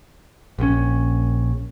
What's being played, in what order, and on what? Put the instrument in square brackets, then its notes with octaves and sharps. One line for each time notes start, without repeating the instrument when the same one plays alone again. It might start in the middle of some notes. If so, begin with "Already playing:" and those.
[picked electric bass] A#1 C#3 C#4